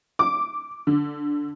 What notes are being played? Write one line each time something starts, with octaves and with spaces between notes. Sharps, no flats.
D6
D3